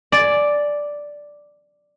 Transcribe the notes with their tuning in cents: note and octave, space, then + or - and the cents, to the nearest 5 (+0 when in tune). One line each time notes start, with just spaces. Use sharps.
D5 +0 G#5 +20